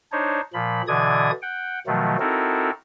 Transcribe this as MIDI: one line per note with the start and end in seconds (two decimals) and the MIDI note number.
0.12 0.41 62
0.12 0.41 63
0.12 0.41 72
0.12 0.41 73
0.54 0.82 46
0.54 0.82 53
0.54 0.82 83
0.88 1.31 47
0.88 1.31 50
0.88 1.31 52
0.88 1.31 74
0.88 1.31 87
0.88 1.31 92
1.42 1.79 78
1.42 1.79 79
1.87 2.17 47
1.87 2.17 51
1.87 2.17 53
1.87 2.17 54
1.87 2.17 57
2.20 2.71 60
2.20 2.71 63
2.20 2.71 64
2.20 2.71 66
2.20 2.71 69
2.20 2.71 70